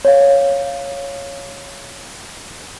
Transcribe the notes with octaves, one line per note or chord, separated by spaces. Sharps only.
C#5 F5